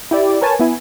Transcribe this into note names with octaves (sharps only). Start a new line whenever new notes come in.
E4 G4 D5
A#4 B4 C#5 G#5 A5
B3 E4 G#5